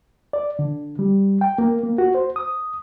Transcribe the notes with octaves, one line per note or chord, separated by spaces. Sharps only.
D5
D3
G3
G5
A#3
A#3
F#4
C5
D#6